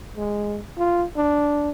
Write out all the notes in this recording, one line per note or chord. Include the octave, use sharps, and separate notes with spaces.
G#3
F4
D4